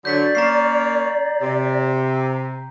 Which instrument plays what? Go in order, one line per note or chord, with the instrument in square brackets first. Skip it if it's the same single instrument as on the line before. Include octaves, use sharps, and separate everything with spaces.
[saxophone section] D3 F#3 [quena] D5 [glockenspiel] G6 B6
[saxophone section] A#3 C#4 [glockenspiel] A#5 C7
[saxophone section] C3